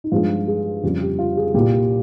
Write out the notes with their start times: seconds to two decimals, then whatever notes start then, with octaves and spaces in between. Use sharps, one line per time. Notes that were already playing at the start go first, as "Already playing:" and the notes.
0.04 D#4
0.12 G2 F3 G#3 F4
0.47 G#4
0.83 F2 C#3 G3 G4
1.01 G4
1.19 F4
1.37 G#4
1.54 C2 A#2 G3 A#3 G4